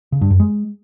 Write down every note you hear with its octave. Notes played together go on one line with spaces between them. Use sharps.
C#3
G2
F#2
G#3